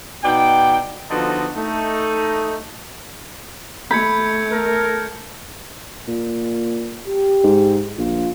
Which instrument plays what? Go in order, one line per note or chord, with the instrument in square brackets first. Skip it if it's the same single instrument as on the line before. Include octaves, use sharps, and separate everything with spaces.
[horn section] B2 D#4 D5 G5
D3 F3 B3 D#4 F#4 A4
A3 D#4
[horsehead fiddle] A3 [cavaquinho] B5 [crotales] G6 G#6 C#7
[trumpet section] A4 A#4
[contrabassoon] A#2
[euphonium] G4
[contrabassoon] G#2
[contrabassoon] A#1 [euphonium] F4